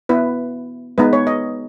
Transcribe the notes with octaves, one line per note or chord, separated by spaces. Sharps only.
B3 E4 B4
G#3 B3 D#4 B4
C#5
D#5